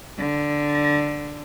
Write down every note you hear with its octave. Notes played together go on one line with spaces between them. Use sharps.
D3